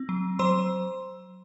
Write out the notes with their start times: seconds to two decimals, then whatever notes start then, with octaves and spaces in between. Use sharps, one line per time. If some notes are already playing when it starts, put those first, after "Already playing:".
Already playing: C4
0.09 F#3
0.39 F#3 C5 C6